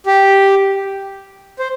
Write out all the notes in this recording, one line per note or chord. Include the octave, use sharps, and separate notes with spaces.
G4
C5